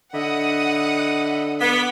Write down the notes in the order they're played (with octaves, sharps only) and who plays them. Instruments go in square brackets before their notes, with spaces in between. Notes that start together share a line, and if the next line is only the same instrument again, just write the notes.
[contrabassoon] D3 [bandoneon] D#5 E5 B5 [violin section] F#5 D#6
[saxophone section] B3 [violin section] D6 B6